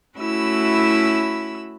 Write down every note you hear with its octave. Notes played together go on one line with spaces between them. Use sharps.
A3 C#4 E4 F#4 B5 E6